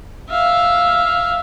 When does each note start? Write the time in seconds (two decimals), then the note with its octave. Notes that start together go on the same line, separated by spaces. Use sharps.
0.30 E5 F5